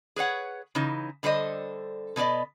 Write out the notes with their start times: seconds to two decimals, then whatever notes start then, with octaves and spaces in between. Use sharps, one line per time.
0.16 G#4 B4 C#5 F#5
0.75 C#3 E3 D#4
1.23 D3 G3 A4 C5 D#5
2.16 B2 B3 D#4 D5 D#5